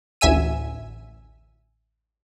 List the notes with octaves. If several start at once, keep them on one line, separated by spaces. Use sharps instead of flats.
A1 D2 E5 G#5 E6 D#7